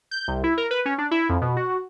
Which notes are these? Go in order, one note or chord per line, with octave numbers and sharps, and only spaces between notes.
G6
C2
E4
A#4
B4
C#4
D4
E4
F2
B2
F#4